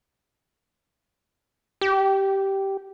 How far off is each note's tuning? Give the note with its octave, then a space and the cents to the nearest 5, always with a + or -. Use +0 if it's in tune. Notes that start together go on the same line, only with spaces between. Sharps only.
G4 -10